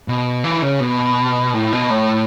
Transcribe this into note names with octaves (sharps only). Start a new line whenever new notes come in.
B2
E3
C#3
B2
A2
B2
A2